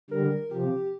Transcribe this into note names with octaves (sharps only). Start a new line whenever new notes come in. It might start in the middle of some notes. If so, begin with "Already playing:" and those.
D3 G3 A#4
C3 F3 G4